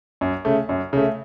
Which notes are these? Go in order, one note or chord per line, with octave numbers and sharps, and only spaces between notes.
F#2
C#3 A3
F#2
C#3 A3